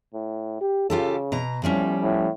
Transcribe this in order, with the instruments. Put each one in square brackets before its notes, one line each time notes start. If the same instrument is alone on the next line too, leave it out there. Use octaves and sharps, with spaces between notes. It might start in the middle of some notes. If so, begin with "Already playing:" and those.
[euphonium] A2
G4
[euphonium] C#3 [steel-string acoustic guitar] F4 G4 A4
[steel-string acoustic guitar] B2 A#5
[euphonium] A2 [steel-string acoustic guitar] F3 G3 C#4
[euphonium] A2